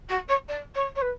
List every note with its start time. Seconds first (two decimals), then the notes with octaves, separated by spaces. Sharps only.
0.09 F#4
0.28 C#5
0.48 D5
0.74 C#5
0.95 C#5
1.01 B4